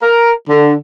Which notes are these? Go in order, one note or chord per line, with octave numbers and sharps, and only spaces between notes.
A#4
D3